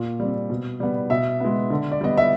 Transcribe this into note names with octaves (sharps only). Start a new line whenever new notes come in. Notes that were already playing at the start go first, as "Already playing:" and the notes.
Already playing: A#2
G3 C4
B2
G3 B3
B2 E5
G#3 B3
D3
D5
G3 B3 D#5
E5